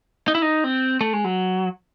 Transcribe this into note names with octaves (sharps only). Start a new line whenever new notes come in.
D#4
E4
D#4
C4
A3
G#3
F#3